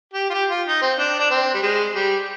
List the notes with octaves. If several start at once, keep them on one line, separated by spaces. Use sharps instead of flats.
G4
F4
G4
F4
D#4
C4
D4
D4
C4
G3
G#3
G3